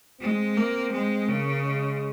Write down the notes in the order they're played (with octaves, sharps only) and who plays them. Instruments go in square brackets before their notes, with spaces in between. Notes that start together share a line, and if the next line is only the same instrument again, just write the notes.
[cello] G#3 [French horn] C4
[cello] A#3
G#3
[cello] C#3 [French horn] A#3
[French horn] G#3